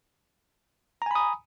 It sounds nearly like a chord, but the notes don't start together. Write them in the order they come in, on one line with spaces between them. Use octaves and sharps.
A#5 G#5 B5 D#6